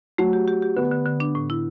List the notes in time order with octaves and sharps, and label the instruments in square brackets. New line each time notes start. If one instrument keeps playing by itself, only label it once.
[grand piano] F#3 [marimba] A3
[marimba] G4
G4
G4
[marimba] D3 [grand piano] B3
[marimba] D3
D3
D4
A2
E4